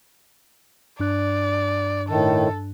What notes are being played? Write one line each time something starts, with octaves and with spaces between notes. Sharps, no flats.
G2 D4 D5 F#6
A2 D#3 A4